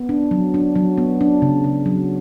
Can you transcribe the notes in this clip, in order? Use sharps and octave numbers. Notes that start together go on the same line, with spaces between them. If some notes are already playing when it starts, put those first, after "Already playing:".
Already playing: B3
D4
F#3
D4
F#3
B3
D4
C#3
C#3
F#3